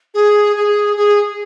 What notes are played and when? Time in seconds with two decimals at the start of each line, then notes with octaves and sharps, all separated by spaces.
0.14 G#4
0.56 G#4
0.96 G#4